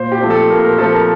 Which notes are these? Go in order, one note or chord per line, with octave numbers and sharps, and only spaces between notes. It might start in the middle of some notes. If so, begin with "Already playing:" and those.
Already playing: A#2 C5
G4
F3 A3 C4
A4
A#2 A#4
A#4
F3 A3 C4 A4
A#4